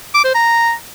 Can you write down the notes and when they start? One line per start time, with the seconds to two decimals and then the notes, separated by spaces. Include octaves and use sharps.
0.14 D6
0.25 C5
0.35 A#5